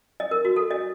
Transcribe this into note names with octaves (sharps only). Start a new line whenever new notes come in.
D#5
A#4
F#4
A4
D#5